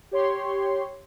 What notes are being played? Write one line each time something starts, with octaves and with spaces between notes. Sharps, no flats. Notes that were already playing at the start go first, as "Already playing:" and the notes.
G4 C#5 C6